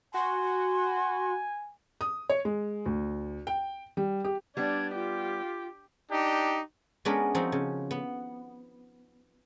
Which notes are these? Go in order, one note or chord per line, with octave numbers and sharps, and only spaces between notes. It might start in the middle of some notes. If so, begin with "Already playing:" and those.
F#4 G#5 C6
D#6
C#5
G#3
D2
G5
G3
G4
G3 B3 D4 G#6
F4 G4
D4 D#4 G4
G#3 B3 C#4 D4 A#4 B4
F3 C4 D#4 F#4
C#3
B3